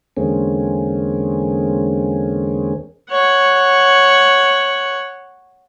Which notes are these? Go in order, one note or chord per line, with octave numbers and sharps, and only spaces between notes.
E2 D3 G#3 A#3 C4 C#4
C#5 F#5